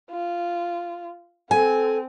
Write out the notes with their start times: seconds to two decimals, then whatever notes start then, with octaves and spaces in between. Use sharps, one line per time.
0.11 F4
1.51 C4 A4 G#5